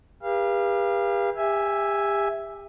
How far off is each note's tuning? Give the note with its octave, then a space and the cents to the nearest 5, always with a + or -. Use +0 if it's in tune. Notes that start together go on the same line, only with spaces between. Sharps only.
G4 +40 B4 -40 F5 -20
G4 +35 E5 +0 G#5 +0